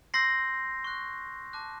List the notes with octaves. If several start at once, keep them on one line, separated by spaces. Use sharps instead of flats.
C6 E6 G6 A#6 C7
C#6 F#6
A5 D6 F#6